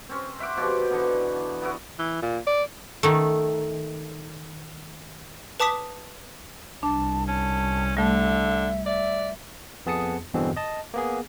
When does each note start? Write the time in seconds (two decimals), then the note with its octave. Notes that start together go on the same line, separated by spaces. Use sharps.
0.09 C4 C#4
0.39 C5 E5 F#5 D6
0.57 B2 F3 F#4 G4
0.90 D3 E3 B3
1.62 B3 E4 F#4
1.99 E3
2.23 A#2
2.47 D5
3.03 D#3 A3
5.60 B4 A5 D6 D#6 B6
6.83 C2 D4 A5
7.28 C#4 A5
7.97 D3 G3 A3 E5
8.86 D5 E5
9.86 F2 B3 G#4 A5 D#6 C#7
10.34 E2 G2 B2 D3 E3 C4
10.57 D#5 A5
10.94 A#3 B3 G#4